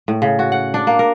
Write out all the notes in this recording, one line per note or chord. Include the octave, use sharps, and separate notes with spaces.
A2
C#3
F#4
F#5
D4
A#3
A#4